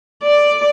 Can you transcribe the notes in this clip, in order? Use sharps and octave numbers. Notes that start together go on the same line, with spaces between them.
D5